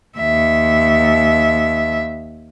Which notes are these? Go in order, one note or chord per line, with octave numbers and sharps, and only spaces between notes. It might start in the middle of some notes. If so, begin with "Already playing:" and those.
D#2 E5